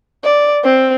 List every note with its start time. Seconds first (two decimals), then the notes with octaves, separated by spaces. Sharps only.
0.24 D5
0.64 C4